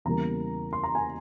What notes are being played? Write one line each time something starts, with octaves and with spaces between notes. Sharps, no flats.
E2 C#3 E3 G3 A#3 A#5
C6
A#5
G#5